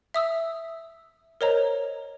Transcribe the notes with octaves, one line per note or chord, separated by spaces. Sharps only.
E5 D#6 E6
A#4 C5 C#5 D#5 A#5